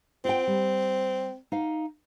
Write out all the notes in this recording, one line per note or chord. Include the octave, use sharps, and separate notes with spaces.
C4 F4 G5
G3
D#4 F5